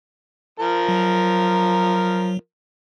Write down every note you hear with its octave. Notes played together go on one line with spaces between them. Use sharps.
F3 A#4
F#3